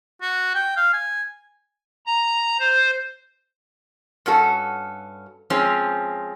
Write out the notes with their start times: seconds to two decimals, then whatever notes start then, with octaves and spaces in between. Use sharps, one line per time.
0.21 F#4
0.55 G5
0.76 F5
0.93 G#5
2.06 A#5
2.59 C5
4.26 G2 C#4 F#4 A4
5.50 F3 G#3 C4 C#4